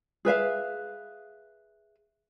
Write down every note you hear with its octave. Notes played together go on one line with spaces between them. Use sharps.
G#4 B4 E5 F5